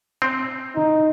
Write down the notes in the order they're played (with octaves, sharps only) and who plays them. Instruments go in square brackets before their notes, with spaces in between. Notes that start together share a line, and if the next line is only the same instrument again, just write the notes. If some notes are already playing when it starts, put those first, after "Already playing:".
[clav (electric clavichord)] C4
[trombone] D#4